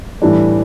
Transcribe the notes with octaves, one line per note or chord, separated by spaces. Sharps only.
A2 E3 G3 D4